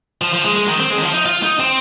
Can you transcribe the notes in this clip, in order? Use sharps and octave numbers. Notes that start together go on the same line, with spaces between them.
F3
F3
G#3
G#3
D#3
C4
G#3
D#3
F3
D#4
F4
D#4
C4